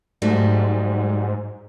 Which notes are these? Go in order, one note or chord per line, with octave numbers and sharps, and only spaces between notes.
G#2 F#3 G3 A3